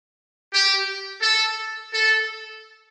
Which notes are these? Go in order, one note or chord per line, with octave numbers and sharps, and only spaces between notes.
G4
A4
A4